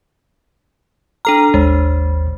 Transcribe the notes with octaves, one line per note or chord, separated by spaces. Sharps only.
D4 A4 A#5 F6
G#1 D#2 G#3 C5